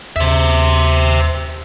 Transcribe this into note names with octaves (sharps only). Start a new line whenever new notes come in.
D#2 C5 E5